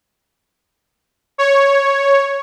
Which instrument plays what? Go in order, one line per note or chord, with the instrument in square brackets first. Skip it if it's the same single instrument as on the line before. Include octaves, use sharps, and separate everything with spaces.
[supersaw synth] C#5